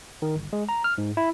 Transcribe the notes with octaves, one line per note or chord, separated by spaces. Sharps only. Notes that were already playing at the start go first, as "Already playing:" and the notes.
D#3
G1
G#3
A#5
F6
G#2
E4